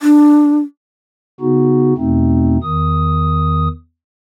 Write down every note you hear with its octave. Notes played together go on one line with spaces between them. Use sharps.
D4
C#3 B3 D#4 F#4
E2 B2 A3 C4 D#4
E2 D#3 D#6